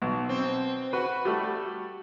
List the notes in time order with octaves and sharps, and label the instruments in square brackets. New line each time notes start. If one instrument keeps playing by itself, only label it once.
[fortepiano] B1
[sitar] C4
[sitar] F#4 [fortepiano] B4
[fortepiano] G3 A3